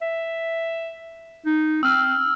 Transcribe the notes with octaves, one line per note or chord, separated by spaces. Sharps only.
E5
D#4
C4 E6 F6